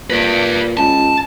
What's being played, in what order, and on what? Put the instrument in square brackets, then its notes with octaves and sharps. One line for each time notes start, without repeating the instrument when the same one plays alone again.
[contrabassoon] A#2 [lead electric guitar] B4 D5
[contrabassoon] C#2 [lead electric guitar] A5